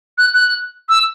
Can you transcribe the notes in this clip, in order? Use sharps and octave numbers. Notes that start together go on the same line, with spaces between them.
F#6
F#6
E6